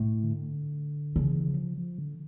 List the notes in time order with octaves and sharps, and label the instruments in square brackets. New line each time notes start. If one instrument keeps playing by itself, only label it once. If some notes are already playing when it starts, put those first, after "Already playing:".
Already playing: [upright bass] A2
[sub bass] D3
[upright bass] C#3 [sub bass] E3
[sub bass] F3
F3
D3